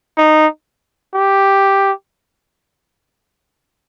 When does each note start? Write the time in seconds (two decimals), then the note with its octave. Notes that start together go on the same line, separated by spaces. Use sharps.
0.17 D#4
1.14 G4